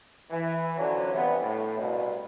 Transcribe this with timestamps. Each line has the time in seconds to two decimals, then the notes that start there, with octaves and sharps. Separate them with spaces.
0.30 E3
0.77 D3 F3 F#3 C#4 D4
1.13 G2 C3 E3 B3
1.41 A2
1.77 C2 G2 B2